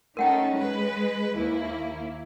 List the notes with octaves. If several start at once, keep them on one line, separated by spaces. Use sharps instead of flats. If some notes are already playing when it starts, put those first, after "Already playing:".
A3 C#4 D#4 A#4 F#5 G5
G#3 B4
D#2 A#3 E4